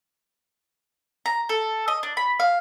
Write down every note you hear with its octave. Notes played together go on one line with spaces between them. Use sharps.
A#5
A4
D#5
D4
B5
F5